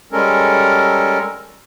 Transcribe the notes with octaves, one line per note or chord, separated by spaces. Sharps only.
G3 G#3 C#4 A4 A#4